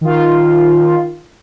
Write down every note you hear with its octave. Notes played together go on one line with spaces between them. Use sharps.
D#3 F4